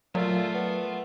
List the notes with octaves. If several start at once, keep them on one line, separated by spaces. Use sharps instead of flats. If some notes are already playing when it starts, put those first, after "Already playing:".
A#2 F#3 A3 F4
B3